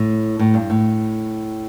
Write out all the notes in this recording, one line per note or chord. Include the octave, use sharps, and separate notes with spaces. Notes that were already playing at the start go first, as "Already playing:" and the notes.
Already playing: A2
A2
G2
A2